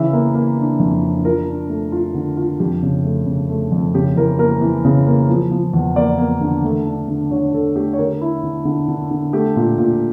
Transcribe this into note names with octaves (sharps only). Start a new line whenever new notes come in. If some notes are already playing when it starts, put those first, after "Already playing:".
Already playing: C#3 E3 E5
A#3
A#3
D4
F2
D4
F4 A#4
D4
A3
F4
D3
F4
F2 G4
C#3
A3
C#3
A3
F2
C#3 G4
E3 A#4
A#3 A#4
E3
C#3
A#3
F3
F3
E2
A#3 D5
A#3
D3
A3
D4
D3
D3 C#5
D3 A4
A3 G4
C#5
D3 A#4
E4
D3
D3
D3
D3
A3 G4
A#2
A#2